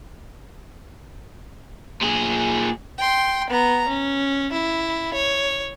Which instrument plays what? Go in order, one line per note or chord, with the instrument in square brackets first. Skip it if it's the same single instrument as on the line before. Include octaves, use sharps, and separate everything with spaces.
[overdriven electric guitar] A#2 G#4
[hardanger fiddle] G5 C6
B3 A#5
C#4
E4
C#5